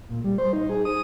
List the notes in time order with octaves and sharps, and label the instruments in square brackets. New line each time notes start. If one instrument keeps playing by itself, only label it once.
[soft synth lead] A#2
G3
C5
D#4
G#4
D#6